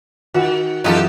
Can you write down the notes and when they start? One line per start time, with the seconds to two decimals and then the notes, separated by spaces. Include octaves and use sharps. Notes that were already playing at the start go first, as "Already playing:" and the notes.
0.34 D#3 F#4 F#5
0.84 F#2 E3 D#4 F4 G4 A4 D#5